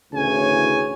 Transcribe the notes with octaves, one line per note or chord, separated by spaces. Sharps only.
D2 A2 C#3 E3 C#5 G#5